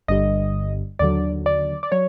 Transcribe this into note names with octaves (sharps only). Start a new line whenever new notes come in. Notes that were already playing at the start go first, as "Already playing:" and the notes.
G1 G2 D3 G3 D#5
D#2 D3 F#3 D5
D5
D5
F#3 C#5